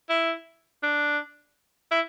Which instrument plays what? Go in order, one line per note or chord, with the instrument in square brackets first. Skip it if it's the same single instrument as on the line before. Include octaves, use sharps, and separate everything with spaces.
[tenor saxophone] E4
D4
E4